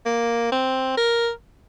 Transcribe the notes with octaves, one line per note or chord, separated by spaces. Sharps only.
A#3
C4
A#4